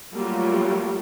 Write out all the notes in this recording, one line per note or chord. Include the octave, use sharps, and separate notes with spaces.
F#3 G3 A3 A#3 F4 G4